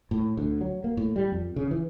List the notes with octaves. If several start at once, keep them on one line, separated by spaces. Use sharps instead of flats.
A2
D2
F#3
A#3
A2
G3
F2
C#3
E3